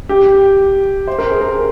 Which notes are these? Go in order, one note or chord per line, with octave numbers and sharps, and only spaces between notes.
G4
C5
A#4
G#4
A#4